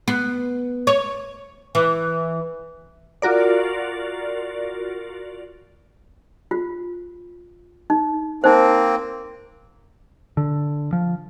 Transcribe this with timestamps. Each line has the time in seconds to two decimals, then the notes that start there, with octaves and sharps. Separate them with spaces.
0.08 B3
0.87 C#5
1.75 E3
3.22 F4 F#4 A#4 D5
6.51 F4
7.90 D#4
8.44 A#3 C4 D#4 C5
10.37 D3
10.93 F3